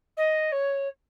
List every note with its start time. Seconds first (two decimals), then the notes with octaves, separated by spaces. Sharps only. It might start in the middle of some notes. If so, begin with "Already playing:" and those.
0.17 D#5
0.52 C#5